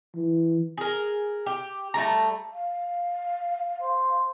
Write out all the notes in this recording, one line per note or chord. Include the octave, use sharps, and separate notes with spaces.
E3
G#4 A#4
G4
G3 A3 A4 A#5
F5
C5